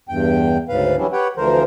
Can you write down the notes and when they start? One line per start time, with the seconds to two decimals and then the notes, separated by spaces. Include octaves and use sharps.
0.09 E2 G2 G5
0.69 D2 G#2 C#3 B4 F5
0.97 E3 F#3 G3 C#4 D4 E4
1.13 G4 B4 C#5 F#5 G5
1.37 D2 D3 E3 F3 A#4 C5